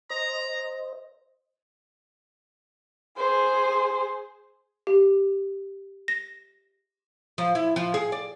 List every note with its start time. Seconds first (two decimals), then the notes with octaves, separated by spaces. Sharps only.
0.10 C5 D#5 A#5
3.18 G#4 C5
4.87 G4
6.08 A#6
7.38 F3
7.55 E4
7.76 F3
7.94 G#4
8.12 D5